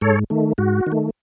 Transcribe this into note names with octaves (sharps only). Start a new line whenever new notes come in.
G#2 A4 C#5
D#3 A3
G#2 F#4
D#3
A3